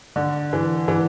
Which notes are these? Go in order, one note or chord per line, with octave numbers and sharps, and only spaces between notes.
D3
E3
E3